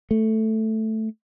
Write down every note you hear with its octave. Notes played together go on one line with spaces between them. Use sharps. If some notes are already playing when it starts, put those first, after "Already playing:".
A3